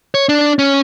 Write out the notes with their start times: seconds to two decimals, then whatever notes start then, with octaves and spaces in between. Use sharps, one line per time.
0.14 C#5
0.29 D4
0.59 C#4